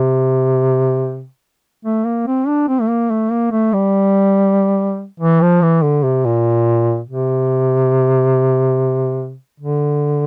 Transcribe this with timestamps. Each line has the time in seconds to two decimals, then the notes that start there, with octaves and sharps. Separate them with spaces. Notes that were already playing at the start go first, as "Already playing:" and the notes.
Already playing: C3
1.85 A3
2.05 A#3
2.27 C4
2.47 D4
2.68 C4
2.81 A3
2.89 A#3
3.10 A3
3.31 A#3
3.51 A3
3.73 G3
5.20 E3
5.41 F3
5.61 E3
5.83 D3
6.03 C3
6.25 A#2
7.08 C3
9.60 D3